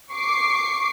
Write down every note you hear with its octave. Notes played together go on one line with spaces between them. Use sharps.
C#6 D6 C7